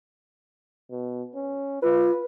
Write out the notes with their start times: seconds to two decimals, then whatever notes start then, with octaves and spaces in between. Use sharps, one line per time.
0.90 B2
1.35 C#4
1.82 F4 B4